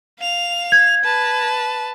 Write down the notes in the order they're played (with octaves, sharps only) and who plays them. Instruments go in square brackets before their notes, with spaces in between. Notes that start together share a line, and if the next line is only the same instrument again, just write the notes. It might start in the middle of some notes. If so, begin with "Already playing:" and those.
[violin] F5 F7
[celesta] G#6
[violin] B4 A5